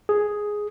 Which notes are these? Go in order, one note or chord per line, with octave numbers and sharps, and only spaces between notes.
G#4